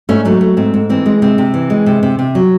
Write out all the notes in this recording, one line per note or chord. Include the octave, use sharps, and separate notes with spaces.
G#2 A3 C#4
F#3 A3
A3
G#2 C4
G#2
E3 C4
G#3
C3 C4
C3
E3
G#3
C3
C3
C3
F#3